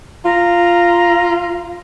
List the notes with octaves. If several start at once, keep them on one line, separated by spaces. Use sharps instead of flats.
F4 A#5